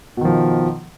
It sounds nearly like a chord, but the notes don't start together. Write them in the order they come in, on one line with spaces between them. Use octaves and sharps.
B2 D#3 F3